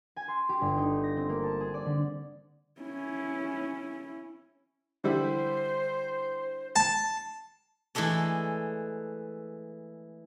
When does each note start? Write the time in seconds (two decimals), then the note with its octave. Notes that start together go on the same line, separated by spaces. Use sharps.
0.16 G#5
0.28 C6
0.49 G4
0.61 G1
0.77 D#4
1.04 A#6
1.17 C4
1.29 A#3
1.43 A5
1.60 G#4
1.74 D5
1.86 D3
2.81 C#4 E4
5.04 D3 G3 E4 C5
6.76 A5
7.95 E3 G#3 A3 A4 D5